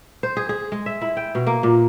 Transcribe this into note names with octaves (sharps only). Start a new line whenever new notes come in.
C5
G#4
G#4
G#3
E5
E4
G5
B2
A#3
A#2